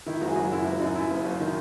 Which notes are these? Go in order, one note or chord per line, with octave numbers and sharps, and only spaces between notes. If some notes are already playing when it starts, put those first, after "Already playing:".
D#3 E4
F#1 F#3 F#4
G#4
F#1 F#3 F#4
F#2 E4
F#1 F#3 F#4
F#2 D#4
F#2 E4
F#1
F#1
D#3